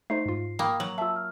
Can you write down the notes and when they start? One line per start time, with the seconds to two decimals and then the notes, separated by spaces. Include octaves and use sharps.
0.10 A3 D#4 C5 C7
0.26 G#2 F4
0.59 A#3 G5 B5 D#6
0.80 F#3 F#7
0.98 F4 E5 A5 E6
1.16 F6